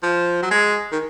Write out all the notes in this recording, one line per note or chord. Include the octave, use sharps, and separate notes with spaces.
F3
F#3
G#3
D#3